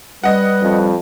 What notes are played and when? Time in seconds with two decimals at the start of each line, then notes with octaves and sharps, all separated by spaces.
0.24 G3 B4 D#5 F#5
0.62 F2